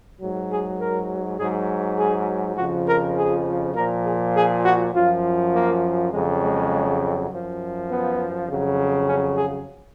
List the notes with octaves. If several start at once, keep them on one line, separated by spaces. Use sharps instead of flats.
G#2 F#3
G#4
A#4
G#2 F#3 G#4
G#4
F2 C#3 F3 F#4
A#4
G#4
A#2 F3 A#4
G#4
G#4
F#4
F#2 F3 F4
A#3
F2 C#3 F#3 G#3
G#3
F#2 F3
B3
F2 C#3 F#3
C#4
G#4